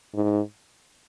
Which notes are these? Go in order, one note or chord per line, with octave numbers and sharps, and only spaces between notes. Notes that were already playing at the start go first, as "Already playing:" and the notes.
G#2